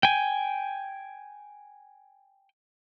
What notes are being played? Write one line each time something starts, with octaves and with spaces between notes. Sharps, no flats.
G5 G#5